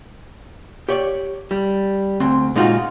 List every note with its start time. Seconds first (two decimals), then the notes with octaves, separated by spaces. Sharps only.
0.89 G4 C#5 D5
1.51 G3
2.20 D2 C4 C6
2.55 A#2 G#3 D#4 F4 F#4